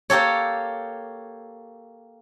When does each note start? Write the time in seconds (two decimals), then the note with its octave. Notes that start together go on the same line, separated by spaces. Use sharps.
0.10 A#3 G4 A4 C#5